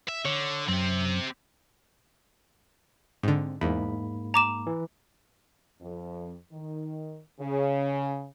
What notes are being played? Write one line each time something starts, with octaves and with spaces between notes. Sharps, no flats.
E5
D3 C#5
F#2 C4 G4
G#2 D3 C4
E2 G#2 A#3 B5
A#5 D6 E7
E3
F2
D#3
C#3